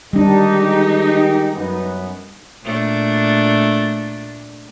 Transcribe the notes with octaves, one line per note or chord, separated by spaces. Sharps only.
D#3 G3 G#3 D4 D#4 G4
F#2 B3
A#2 A3 D4